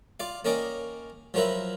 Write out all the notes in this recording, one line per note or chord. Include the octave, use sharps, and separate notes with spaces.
F4 D5 F5
A#3 C#4 A#4 D5 D#5 G5
F3 F#3 F4 A#4 B4 E5